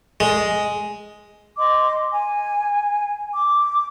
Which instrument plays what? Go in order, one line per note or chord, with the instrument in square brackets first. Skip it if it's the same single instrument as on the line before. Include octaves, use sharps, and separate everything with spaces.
[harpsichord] G#3
[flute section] D#5 C6 D6
G#5
D6